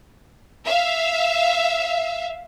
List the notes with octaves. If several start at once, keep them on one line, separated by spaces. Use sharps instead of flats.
E5 F5